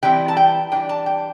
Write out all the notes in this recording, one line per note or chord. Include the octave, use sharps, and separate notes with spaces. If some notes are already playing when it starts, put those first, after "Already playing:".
E3 G3 C4 E4 G5
A5
G5
E3 G3 D4 G5
A5
G5